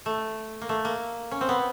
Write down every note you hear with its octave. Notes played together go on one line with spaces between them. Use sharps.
A3
A#3
A3
A#3
C#4
C4
B3